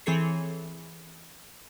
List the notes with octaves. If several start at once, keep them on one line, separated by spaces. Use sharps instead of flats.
E3 C4 G#4 A4 C#5 C7